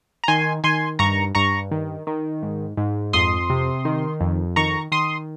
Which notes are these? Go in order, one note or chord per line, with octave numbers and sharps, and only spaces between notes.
A#5
D#3 G#5 C6
D#3 G#5 C6
G2 A#5 C#6
G2 A#5 C#6
D#3
D#3
G#2
G#2
F2 C6 D#6
C3
D#3
F2
D#3 A#5 C#6
D#3 C6 D#6